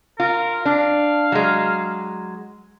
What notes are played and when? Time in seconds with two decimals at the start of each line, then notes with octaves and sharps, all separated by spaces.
0.20 F4 A#4
0.65 D4 F5
1.32 F#3 G#3